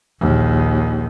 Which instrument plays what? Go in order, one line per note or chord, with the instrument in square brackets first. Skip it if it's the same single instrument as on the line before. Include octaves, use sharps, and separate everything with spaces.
[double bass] A#1 D#2